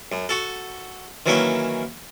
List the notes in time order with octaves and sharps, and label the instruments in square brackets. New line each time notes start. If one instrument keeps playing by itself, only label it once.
[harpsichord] F#2
F#4 A4
D#3 E3 F#3 A#3 C#4 E4